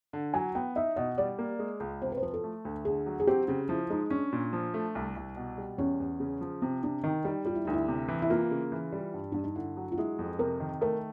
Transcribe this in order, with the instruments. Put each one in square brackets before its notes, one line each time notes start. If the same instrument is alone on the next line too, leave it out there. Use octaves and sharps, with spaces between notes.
[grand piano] D3
[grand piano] F#3 [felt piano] G#5
[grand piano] B3 [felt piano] G5
[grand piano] D#4 [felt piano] E5
[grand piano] B2 [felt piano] D#5
[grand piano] G3 [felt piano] D5
[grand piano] A#3
G#3
C#2
[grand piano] C3 [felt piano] C5
[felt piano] B4
C5
[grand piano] F3 [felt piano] B4
[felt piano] A4
[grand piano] A3
D2
[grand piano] D3 [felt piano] G#4
[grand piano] F#3
[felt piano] G#4
[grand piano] C4 [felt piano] G4
[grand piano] C#3 [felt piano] G4
[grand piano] F3 [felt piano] E4
[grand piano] G#3 [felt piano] D#4
[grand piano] C#4 [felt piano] D4
[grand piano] A#2
F3
A3
C2
C2
B2
G3
[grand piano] E2 [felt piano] C#4
[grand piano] E2
C#3
F3
[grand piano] C3 [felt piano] C4
[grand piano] C3 [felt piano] D4
[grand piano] D#3 [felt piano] D#4
[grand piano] G3 [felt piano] D#4
[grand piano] G3 [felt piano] F4
[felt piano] E4
[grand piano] D2 [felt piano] D#4
[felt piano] E4
[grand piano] C3
E3
[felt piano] E4
[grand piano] A#3 [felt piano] F4
[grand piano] C#3
E3
G3
G2
[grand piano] G2 [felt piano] D4
[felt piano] D#4
[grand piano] D3 [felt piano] E4
[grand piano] F#3
[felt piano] F4
[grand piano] G#3 [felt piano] E4
[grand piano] F2
[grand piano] C3 [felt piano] A#4
[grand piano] D#3
[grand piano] A3 [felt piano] A#4